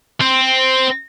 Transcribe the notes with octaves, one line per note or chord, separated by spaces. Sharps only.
C4